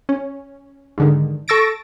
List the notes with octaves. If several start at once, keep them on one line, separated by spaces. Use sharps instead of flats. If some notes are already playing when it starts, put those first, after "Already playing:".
C#4
G#2 D3 D#3
A4 C#6 E6 A6 A#6 D7